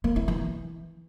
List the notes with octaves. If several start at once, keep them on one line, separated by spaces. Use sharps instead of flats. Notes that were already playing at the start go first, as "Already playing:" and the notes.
A#3
E4
E3